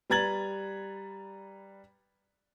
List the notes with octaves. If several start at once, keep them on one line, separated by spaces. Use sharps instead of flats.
G3 B4 A#5 G#6 A6 F#7